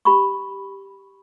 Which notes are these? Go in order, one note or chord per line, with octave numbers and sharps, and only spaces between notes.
G4 B5 C#6